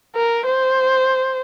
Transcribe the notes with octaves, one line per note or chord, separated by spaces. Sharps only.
A#4
C5